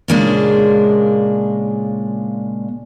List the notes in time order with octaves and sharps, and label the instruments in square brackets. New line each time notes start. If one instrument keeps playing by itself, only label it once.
[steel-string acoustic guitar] A#2 C#3 G#3 A#3 D4 F4